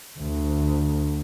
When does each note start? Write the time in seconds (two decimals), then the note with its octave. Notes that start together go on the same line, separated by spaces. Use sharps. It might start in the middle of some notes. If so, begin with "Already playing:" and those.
0.19 D2